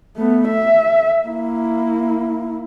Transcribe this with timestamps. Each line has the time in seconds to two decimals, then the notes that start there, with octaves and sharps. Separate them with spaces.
0.16 A3 B3
0.48 E5
1.25 A#3 E4